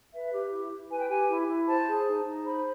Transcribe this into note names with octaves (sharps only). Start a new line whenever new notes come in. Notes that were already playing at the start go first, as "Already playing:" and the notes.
B4 E5
G4
E4
E4
B4 G#5
G5
G4 G#5
E4
E4
C5 A5
G#4
D#4
D#4
C5 B5